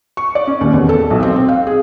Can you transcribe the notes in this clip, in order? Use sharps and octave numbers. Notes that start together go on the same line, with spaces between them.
C#6
D5
C#4
D#2
E2
A4
B1
C4
C4
F5
G#4